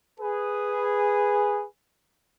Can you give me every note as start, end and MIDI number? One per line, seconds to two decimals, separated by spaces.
0.19 1.64 68
0.19 1.64 71